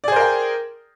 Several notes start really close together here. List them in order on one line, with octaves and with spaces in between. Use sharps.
D5 G#4 C5 A#4 G5